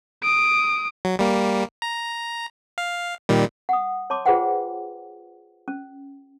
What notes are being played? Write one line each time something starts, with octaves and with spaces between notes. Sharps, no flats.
D#6 D7
F#3
G3 A#3
A#5
F5
A#2 D#3 G3
F#5 D#6
C#5 A5 C6 D6
F4 G#4 B4 C5 F#5 G5
C#4